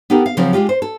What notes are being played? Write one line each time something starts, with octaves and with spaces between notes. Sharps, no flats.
B3 D4 D#4 G4 A4 A#4
F5
C#3 F3 F#3 C4 C#4
G#3 D4 F4 G4
C5
A4